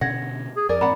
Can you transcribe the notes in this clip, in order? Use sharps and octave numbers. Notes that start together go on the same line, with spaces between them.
B2 D3 C#4 F#5 G#6 A#6
G#4
F2 G#4 A#4 D5
G#2 E3 A#3 C4 F#5 A#5 B5